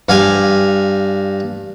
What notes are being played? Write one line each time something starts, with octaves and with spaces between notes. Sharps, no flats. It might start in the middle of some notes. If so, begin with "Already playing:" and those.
G2 F5 G#5